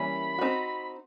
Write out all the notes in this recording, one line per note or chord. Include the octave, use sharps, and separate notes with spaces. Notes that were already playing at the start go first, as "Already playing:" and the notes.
Already playing: E3 G3 A#3 C#4 E4 B5
C4 D#4 F#4